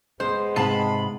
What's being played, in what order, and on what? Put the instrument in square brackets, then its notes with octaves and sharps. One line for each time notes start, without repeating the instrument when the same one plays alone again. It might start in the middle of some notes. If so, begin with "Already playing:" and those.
[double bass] G#3 B3 [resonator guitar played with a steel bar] C5
[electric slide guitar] G#2 C3 F4 [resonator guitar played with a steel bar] A5 [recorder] B5